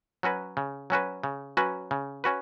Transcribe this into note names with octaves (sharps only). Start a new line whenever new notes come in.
F#3 C#4 F#4 B4
C#3
F#3 C#4 F#4 B4
C#3
F#3 C#4 F#4 B4
C#3
C#4 F#4 B4